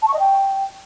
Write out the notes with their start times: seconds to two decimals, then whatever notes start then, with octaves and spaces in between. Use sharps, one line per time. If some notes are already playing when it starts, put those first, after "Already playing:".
0.02 A5
0.08 C#6
0.14 D#5
0.19 G5